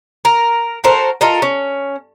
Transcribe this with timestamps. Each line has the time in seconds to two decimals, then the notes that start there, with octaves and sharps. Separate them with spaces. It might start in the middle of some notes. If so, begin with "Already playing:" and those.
0.25 A#4
0.84 F#4 A4 A#4 C5
1.21 F4 A4 A#4 D#5
1.42 C#4